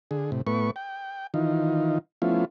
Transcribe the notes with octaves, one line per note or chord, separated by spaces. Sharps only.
D3 G#4
A2 C3
A2 A3 B3 B4 C#6
G5
D#3 E3 D#4 F4
F3 A3 B3 C#4 E4 F4